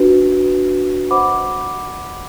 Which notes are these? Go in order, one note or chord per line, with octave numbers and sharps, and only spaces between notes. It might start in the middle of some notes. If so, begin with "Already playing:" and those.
Already playing: D4 F#4 B4
C5 D#5 F#5 B5 D6